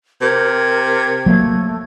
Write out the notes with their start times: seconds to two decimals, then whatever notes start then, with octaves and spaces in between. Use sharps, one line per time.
0.22 C3 A#4 G#6
1.26 F#3 A3 A#3